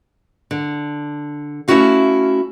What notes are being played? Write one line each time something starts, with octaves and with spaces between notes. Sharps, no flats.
D3
A3 C4 C#4 E4 F#4 F5